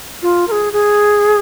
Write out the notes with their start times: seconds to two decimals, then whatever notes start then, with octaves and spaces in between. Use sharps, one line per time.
0.22 F4
0.48 A#4
0.52 G#4
0.73 G#4